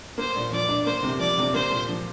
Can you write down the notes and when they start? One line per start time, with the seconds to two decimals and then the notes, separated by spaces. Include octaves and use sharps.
0.18 A#3 C5
0.36 A#2
0.52 F3 D5
0.69 D4
0.86 A#3 C5
1.03 C3
1.20 F3 D5
1.38 C3
1.54 A#3 C5
1.71 A#2
1.88 F3